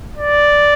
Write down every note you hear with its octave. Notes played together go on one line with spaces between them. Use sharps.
D5